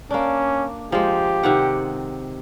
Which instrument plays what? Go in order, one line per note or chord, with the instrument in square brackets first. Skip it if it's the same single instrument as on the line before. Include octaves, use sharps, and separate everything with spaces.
[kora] A#3 D4 [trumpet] C#4
[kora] F3 G#3 [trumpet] G4
[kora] C3 D#3 F#5